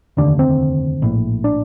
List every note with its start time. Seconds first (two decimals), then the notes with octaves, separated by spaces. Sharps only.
0.17 F1 D#2 D3 D4
0.39 C4
1.02 A#1 A2
1.44 D4